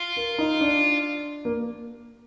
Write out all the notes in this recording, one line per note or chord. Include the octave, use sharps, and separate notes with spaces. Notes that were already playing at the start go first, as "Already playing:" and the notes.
Already playing: F4
A#4
D#4
D4
A#3